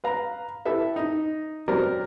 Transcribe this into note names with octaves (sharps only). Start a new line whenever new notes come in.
B4 F5 A#5
E4 G4 A4 B4 E5
D#4
F#3 C4 G4 A#4 B4 D5